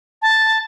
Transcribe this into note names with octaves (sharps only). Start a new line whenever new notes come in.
A5